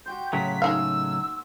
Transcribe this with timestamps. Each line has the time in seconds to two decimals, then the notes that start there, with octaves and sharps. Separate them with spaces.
0.06 F#4 G4 C5 G6
0.33 A2 C#3 F#3 B6
0.62 G#3 A#3 D#4 F5 G#5 E6